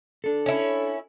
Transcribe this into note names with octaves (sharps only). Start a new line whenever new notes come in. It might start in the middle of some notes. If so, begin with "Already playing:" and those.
D4 A4
C#4 E4